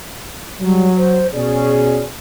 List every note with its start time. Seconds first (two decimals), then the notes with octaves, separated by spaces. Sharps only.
0.60 F#3 G3
0.98 C5
1.34 B2 C#4 G#4 D5